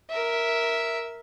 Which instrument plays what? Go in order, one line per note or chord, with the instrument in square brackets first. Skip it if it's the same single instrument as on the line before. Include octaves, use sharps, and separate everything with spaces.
[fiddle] A#4 E5